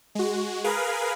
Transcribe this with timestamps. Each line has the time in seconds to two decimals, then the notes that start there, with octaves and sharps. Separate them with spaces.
0.15 G#3 F#4
0.64 G#4 A#4 B4 F5